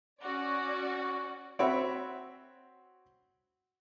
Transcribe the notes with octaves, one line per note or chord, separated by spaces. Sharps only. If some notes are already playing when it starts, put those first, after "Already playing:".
C#4 F#4 D5
C4 F#4 C#5 E5 B5